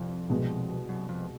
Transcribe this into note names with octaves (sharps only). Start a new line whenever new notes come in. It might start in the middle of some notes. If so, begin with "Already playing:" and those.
Already playing: C2 F2
C2 B2 G#3
F#2
F2